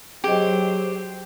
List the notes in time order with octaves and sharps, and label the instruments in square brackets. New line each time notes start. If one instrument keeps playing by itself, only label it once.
[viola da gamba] F#3 C5 [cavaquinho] G4 [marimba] G#4 D#5